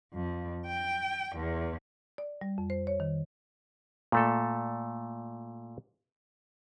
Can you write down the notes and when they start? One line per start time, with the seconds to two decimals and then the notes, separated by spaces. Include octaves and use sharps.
0.12 F2
0.66 G5
1.35 E2
2.18 D5
2.41 G3
2.58 F2
2.70 C5
2.87 C#5
3.00 D#3
4.12 A#2 A3 A4